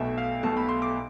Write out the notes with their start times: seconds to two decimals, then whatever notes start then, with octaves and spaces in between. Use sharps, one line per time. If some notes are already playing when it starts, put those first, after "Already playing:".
Already playing: B1 B2 A3 E5
0.18 F5
0.43 B1 B2 A3 A5
0.57 B5
0.69 C6
0.82 D6